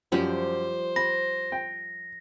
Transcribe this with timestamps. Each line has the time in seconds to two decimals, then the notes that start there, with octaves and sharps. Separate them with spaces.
0.12 F#2 F3 G3 G4 C5
0.96 B5 A#6
1.52 G5